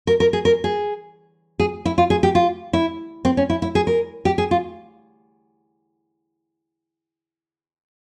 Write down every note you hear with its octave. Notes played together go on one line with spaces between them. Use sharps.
A#4
A#4
G#4
A#4
G#4
G#4
E4
F4
G#4
G4
F4
E4
C4
C#4
E4
E4
G#4
A#4
G4
G#4
F4